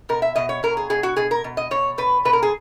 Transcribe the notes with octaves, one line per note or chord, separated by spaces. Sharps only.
B2 A#4
E5
B2 D#5
C#5
B2 A#4
G#4
B2 G#4
F#4
B2 G#4
A#4
B2
D#5
B2 C#5
B2 B4
B2 B4
A#4
G#4